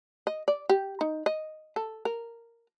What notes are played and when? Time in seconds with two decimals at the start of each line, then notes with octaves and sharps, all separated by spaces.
0.27 D#5
0.48 D5
0.69 G4
1.01 D#4
1.26 D#5
1.76 A4
2.05 A#4